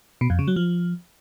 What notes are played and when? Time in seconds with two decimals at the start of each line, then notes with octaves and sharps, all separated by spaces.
0.21 B2
0.30 F2
0.39 C#3
0.48 F#3
0.56 F3